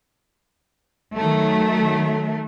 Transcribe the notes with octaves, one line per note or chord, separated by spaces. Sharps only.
D#3 F#3 A3